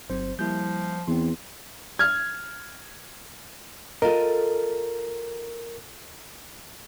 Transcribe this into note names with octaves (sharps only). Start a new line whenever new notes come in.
G1 F#3 C4 C5
F3 G3 A#3 E4 G6
E2 E3 C4 C6
F6 G#6
F4 A4 A#4 D#5